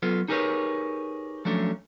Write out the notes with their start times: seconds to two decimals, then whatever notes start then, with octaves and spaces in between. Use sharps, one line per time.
0.03 F#3 B3 F4 A4 B4
0.28 D#4 G4 G#4 A#4 B4 C#5
1.45 F3 F#3 A3 C#4 D4